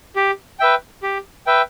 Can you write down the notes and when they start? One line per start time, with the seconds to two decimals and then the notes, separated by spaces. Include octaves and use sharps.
0.16 G4
0.60 B4 E5 G5
1.03 G4
1.46 B4 E5 G5